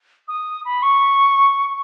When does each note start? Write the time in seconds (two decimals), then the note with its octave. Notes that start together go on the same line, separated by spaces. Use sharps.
0.28 D#6
0.64 B5
0.82 C#6